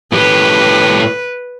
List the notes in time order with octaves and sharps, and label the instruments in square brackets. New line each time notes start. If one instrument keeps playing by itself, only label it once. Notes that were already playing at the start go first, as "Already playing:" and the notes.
[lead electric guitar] A2 G4 [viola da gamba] B4